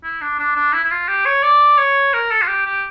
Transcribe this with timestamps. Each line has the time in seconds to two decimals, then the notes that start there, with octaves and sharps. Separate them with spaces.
0.04 E4
0.21 D4
0.39 D4
0.56 D4
0.73 E4
0.84 E4
0.91 F4
1.08 G4
1.26 C#5
1.43 D5
1.78 C#5
2.14 A#4
2.31 A4
2.42 F4
2.48 G4
2.66 G4